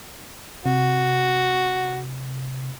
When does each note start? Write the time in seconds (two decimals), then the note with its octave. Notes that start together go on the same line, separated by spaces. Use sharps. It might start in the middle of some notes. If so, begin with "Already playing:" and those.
0.66 C3 F#4